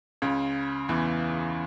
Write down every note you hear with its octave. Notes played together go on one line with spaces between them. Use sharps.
C#2 C#3
E2 E3